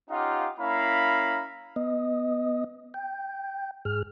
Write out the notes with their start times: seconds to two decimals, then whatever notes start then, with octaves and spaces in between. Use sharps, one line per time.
0.10 C#4 D#4 F4 G4 F5 F#5
0.59 A#3 C#4 E4 F5 A#5 B5
1.76 B3 D#5
2.94 G5
3.85 G#2 G#4 F6